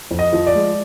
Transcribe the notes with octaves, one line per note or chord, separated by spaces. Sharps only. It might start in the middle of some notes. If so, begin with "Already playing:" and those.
F2
D#5
F3
D5
G#3